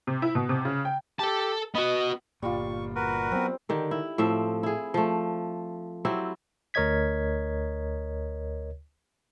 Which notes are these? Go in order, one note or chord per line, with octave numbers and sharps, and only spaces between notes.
C3
E4
B2
C3
C#3
G5
G4 A4 A5
B3 F#4 D#5
G1 A#2 G3 F4 C#6
F#4 A#4 B4
F#3 B3 C4
D3 D#3 G4
E4
A2 F3 C4 E5
E4 G#4
F3 A3
F#3 C4 E4 G4
D2 A#4 C#5 D#5 G#6 B6